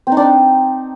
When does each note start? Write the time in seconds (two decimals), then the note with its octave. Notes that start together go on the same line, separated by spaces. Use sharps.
0.07 C4
0.12 D#4
0.17 D4
0.22 D#4